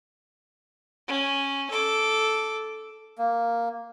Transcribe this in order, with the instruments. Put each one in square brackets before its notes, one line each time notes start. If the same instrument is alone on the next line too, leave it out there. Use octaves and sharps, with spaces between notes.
[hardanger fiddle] C#4
A4 D6
[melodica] A#3